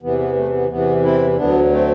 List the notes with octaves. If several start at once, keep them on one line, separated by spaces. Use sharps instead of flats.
E2 C3 E3 B3
B3
A3
B3
E2 C3 E3 B3
C4 E4
D2 D3 F#3 B3 D4
A3 C4